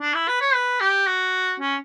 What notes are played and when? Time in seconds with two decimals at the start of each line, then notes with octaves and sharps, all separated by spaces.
0.01 D4
0.15 E4
0.28 B4
0.41 C#5
0.54 B4
0.81 G4
1.07 F#4
1.60 C#4